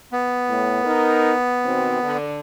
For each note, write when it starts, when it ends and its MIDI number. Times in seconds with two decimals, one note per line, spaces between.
0.12 2.17 59
0.49 0.80 45
0.85 1.34 63
0.85 1.34 70
1.64 1.98 47
1.64 1.98 51
1.64 1.98 60
2.02 2.40 50